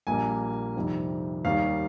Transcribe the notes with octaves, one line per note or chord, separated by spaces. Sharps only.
A#1 A#2 G3 A#3 G#5
F2 C3 D#3 G3 C4
D#2 D#3 G3 F5